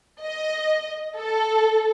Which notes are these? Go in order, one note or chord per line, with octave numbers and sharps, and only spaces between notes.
D#5
A4